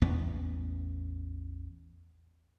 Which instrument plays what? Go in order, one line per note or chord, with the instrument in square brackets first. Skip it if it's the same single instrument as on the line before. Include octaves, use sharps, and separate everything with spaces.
[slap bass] A1 E2 B3